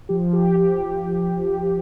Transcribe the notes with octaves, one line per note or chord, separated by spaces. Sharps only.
F3 G4
G4
F3 G4